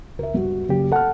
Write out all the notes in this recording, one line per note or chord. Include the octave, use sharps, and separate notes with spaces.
C#2 A#4 E5
G2 F#4
F#1 C#3 G4
A4 F#5 A5 F6